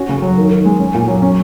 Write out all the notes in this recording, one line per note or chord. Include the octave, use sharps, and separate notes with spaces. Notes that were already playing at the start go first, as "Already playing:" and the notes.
Already playing: C#4 F#4
C#3
F#3
D#3
D#3
G#3
C#4
A#2
F#3
C#4